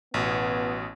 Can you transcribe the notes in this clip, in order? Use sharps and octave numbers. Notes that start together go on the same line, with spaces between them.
A1 B2 B3